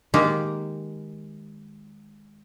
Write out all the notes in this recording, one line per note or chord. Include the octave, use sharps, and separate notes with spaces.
D#3 G#3 A#3 G4